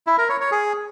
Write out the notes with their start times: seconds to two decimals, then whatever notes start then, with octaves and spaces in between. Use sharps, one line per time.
0.07 E4
0.18 A#4
0.29 C#5
0.40 C#5
0.51 G#4